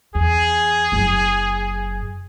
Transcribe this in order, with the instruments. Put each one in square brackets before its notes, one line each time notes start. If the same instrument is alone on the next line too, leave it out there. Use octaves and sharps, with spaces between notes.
[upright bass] E2 [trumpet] G#4
[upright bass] F#1 F#2